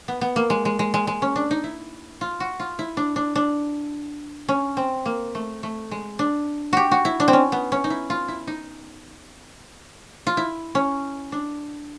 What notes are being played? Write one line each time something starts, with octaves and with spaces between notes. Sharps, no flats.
B3
B3
A#3
G#3
G#3
G#3
G#3
G#3
C#4
D4
D#4
E4
F4
F#4
F4
E4
D4
D4
D4
C#4
C4
A#3
A3
A3
G#3
D4
F#4 G4
F#4
E4
D4
C4
C#4
B3
C#4
D#4
E4
F4
E4
D#4
F4
E4
C#4
D4